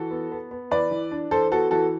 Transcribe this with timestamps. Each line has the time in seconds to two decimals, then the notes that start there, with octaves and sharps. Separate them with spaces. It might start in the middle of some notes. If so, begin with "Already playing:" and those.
Already playing: E3 F#4 A4
0.11 B3
0.32 B3
0.51 B3
0.71 E3 B4 D5
0.91 E3
1.11 D4
1.31 E3 A4 C5
1.51 B3 F#4 A4
1.71 E3 F#4 A4